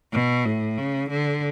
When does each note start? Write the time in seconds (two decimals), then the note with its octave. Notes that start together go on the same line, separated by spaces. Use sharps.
0.13 B2
0.45 A2
0.78 C#3
1.10 D3